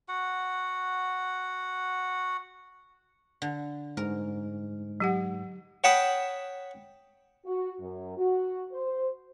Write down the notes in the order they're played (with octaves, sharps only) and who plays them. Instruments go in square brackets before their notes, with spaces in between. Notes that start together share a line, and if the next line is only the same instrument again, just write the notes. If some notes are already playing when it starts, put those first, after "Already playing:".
[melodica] F#4 F#5
[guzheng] D3
[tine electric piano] G#2 [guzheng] A#4
[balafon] F#3 G4 F#5
[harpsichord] C#5 F#5 G5 A5 B5 D#6
[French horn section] F#4
F#2
F#4
C5